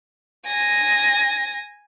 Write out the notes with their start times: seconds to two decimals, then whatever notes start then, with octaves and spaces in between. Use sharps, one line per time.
0.47 G#5 A#6